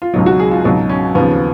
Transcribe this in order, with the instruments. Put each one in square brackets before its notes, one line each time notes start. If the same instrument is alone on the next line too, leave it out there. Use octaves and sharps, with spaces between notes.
[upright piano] F4
C#2 B2 F#3 D#4
F#4
G#4
F4
C#2 B2 F#3 D#4
C#4
D#2 C#3 F3 B3